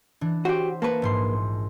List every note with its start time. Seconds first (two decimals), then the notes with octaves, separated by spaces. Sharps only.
0.21 E3 D4
0.45 F#4 G4 C5 E5
0.82 A#3 B4 A5 C#6
1.02 A#1 G#2 C6